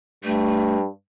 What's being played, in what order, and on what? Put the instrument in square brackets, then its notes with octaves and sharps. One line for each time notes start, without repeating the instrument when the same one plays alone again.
[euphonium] G2 [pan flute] A3